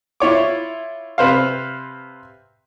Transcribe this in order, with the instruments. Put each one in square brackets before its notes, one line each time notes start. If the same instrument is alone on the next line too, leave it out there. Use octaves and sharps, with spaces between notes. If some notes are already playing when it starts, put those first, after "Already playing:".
[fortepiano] E4 F4 C#5 D6
C3 B4 C5 F5